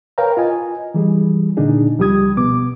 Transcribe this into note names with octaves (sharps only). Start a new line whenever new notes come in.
A#4 B4 C#5 F5 G5 A#5
F4 D#5 G#5
E3 G3 G#4
A#2 D3 D4 D#4 G#4
C#2 F3 G3 G4 D#6 G#6
B2 B3 D6